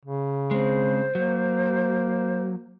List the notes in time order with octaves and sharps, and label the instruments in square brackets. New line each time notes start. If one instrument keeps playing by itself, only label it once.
[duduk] C#3
[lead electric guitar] G#3 C4 [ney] C5
[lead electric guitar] F#3 [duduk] A#3